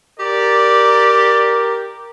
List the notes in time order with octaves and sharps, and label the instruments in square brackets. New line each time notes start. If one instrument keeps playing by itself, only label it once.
[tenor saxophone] G4 [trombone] A#4 [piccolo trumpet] D5